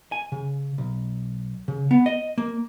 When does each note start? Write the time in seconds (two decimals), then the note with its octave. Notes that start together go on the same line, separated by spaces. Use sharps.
0.12 G#5
0.32 C#3
0.78 B1
1.68 C#3
1.91 B3
2.06 D#5
2.38 A#3